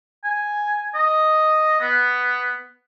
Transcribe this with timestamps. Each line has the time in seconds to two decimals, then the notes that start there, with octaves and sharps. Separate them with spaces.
0.24 G#5
0.95 D#5
1.81 B3